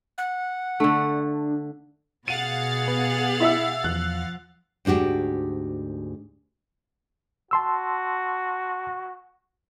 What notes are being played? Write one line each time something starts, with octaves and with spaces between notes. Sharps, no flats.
F#5
D3 A3 D4
B2 G#4 F5 F#5 A6 D#7
B3
E4 E5 E6
E2 F3 F#6
D2 G#2 D4 F#4 G4
F#4 A5 C6 E6